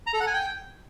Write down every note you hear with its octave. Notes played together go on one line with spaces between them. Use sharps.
A#5
A4
F#5
G#5
G5